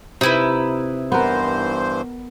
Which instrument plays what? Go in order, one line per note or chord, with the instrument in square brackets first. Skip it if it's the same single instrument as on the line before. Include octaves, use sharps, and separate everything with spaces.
[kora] C3 [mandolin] D#4 E4 B4
[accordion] G2 E3 C5 [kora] B3 A#4